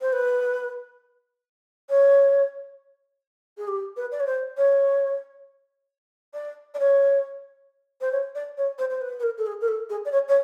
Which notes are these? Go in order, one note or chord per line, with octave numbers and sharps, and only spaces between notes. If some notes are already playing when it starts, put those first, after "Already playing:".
C5
B4
C#5
G#4
G4
B4
D5
C#5
C5
C#5
D5
D5
C#5
C5
C#5
D5
C#5
C5
C5
B4
B4
A#4
A4
G#4
A#4
A4
G#4
D5
C#5
C#5